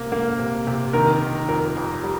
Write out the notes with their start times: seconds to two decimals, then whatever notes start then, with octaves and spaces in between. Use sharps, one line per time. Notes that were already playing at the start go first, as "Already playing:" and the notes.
Already playing: C3 A#3
0.12 A#3
0.39 C3
0.67 C3
0.93 D#3 A#4
1.22 D#3
1.48 F2 A#4
1.77 F2
2.04 G3